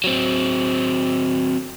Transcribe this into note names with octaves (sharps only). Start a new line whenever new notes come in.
F#3 C4